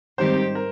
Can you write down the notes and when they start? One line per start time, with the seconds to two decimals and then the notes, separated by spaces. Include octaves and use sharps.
0.18 G#2 D#3 G3 C4 G4 C5
0.55 A#4